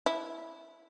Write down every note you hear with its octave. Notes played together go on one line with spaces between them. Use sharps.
E4